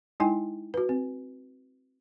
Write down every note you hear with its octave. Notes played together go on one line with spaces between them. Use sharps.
G#3 D#4 E4 G5 G#5
F#4 B4
C4